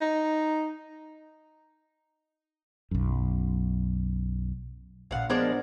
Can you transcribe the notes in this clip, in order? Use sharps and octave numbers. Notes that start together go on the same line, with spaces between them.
D#4
B1 F#2
A#1 A#2 F5 F#5
F3 G#3 B3 D4 A#4 D5